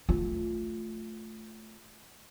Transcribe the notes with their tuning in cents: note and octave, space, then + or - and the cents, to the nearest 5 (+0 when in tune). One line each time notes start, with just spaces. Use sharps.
A3 +0 F4 +0